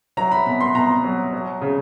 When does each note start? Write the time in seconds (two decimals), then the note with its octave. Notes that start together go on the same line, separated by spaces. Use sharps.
0.17 F#3 A#5
0.32 B5
0.46 B2 B5
0.60 C6
0.75 B2 A#5
1.04 F#3
1.33 F#3
1.61 C#3